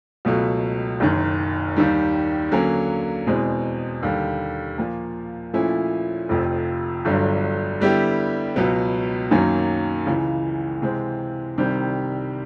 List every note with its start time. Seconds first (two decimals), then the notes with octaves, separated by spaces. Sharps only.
0.25 C#2 B2 F#3 A3
1.00 F#1 F#2 D#3
1.76 D#2 D#3 G3
2.51 D3 F#3 A#3 C#4
3.27 E2 B2 G#3 C4
4.03 D#2 D3 G3
4.78 A#2 F3 A#3
5.54 A#2 F3 A3 C#4 E4
6.29 F1 F2 C3 F3
7.05 G1 G2 D3 F#3
7.80 D3 G3 B3 E4 G4
8.56 C#2 B2 F#3 B3
9.31 F#2 D#3 F#3 A#3 C#4
10.06 C#2 C#3 E3
10.82 C3 E3 G#3 C4
11.58 C2 C3 D#3 G3 C4